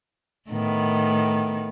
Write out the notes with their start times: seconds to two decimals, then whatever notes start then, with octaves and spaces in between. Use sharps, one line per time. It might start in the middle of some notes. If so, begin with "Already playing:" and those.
0.49 A2 D#3 B3